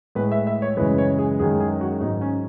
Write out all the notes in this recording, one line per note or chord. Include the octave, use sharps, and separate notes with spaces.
A2 G#3 B4
E5
E5
C#5
F#2 C#3 E3 G#3 B4
C#5
G#4
F#2 D#3 G#3 G#4
G#4
F#4
G#2 F#3 D#4
C#4